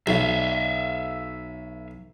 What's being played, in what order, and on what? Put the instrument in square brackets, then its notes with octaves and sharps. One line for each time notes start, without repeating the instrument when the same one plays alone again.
[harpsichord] B1 [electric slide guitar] E5 F5